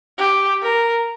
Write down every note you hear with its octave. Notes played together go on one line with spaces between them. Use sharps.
G4
A#4